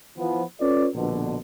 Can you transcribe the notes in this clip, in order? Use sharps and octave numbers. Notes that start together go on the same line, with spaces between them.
E3 F3 B3
C#4 F4 A4 B4 C#5 D5
A#1 B2 D3